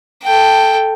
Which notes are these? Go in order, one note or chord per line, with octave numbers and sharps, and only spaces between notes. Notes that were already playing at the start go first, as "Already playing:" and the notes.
A4 G5